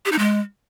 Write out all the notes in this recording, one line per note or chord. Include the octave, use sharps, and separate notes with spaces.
G4
D#4
G#3